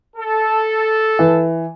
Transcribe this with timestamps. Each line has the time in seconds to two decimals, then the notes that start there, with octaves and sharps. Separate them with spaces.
0.17 A4
1.19 E3